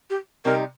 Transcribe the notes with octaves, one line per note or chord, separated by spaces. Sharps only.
G4
C3 G3 D#4 G4 A#4